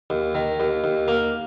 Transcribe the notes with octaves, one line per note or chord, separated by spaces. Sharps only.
D#2
D#3
D#2
D#2
A#3